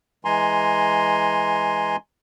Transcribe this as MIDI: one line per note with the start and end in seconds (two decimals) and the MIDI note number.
0.25 1.96 52
0.25 1.96 56
0.25 1.96 80
0.25 1.96 82
0.25 1.96 84